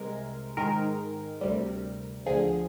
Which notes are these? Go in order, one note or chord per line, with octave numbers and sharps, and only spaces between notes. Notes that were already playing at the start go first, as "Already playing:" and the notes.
Already playing: C2 C3 G#3 A#4
G#2 D#3 G#3 A#4
D2 C3 G3
D2 D3 F3 G#4